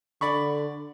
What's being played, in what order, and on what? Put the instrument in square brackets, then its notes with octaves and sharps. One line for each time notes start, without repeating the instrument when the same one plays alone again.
[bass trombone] D3 [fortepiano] D5 B5 C#6